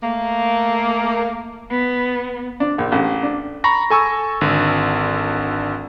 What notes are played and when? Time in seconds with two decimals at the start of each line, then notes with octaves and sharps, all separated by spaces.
0.03 A3 A#3
1.70 B3
2.60 D4
2.78 A#1
2.92 A1
3.23 D4
3.64 A#5 B5 C#6 A#6
3.90 A4 G#5 C#6 E6
4.41 G#1 D3